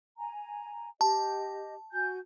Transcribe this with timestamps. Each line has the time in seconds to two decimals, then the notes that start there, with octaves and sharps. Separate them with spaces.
0.18 G#5 A#5
1.01 G4 D#5 A5
1.93 F#4 G#5 G6